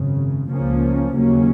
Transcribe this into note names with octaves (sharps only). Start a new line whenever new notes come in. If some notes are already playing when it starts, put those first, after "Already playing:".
Already playing: G#1 F#2 C#3
C#2 C#3 F3 A#3 C#4
D#2 C#3 F#3 A#3 C#4